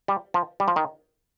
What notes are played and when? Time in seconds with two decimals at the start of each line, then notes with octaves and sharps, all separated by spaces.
0.08 G3
0.34 F3
0.60 G3
0.68 F3
0.76 D#3